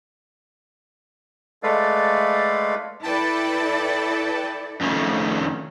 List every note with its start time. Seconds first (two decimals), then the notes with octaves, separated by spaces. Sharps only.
1.63 G#3 A3 A4 B4 D5 F5
3.03 E4 A4 B4 D5 G5 A5
4.81 F2 D#3 A3 C#4